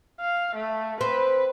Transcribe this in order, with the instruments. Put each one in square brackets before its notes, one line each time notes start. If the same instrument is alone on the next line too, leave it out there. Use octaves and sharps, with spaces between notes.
[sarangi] F5
A3
[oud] C4 [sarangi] B4